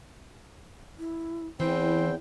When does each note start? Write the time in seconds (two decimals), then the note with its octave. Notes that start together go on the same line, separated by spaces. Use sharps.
0.99 E4
1.60 E2 E3 C4 E4 G5